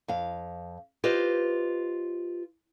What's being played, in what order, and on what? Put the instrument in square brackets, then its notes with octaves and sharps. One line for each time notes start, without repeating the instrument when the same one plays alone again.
[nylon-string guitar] F2 F5
F4 G4 B4 C5 D#5